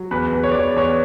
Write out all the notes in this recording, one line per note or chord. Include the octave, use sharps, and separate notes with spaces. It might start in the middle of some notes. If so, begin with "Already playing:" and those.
Already playing: F#3
E2 B4
E2
C#5
D5
E2 C#5
D5
E2 C#5